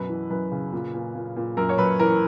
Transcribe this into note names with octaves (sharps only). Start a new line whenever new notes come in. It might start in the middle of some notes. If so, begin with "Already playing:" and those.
Already playing: F#2 B2 B4
E3
F#2 B4
C#3
A#2
A#2
A#2
A#2
F#2 A#4
C#5
F#2 B4
E3 A#4